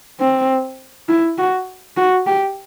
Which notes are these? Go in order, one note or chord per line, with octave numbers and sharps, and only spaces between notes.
C4
E4
F#4
F#4
G4